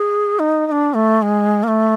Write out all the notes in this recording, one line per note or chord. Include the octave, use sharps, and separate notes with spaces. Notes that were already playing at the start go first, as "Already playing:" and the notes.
Already playing: G#4
D#4
D#4
D4
A3
G#3
A#3
A3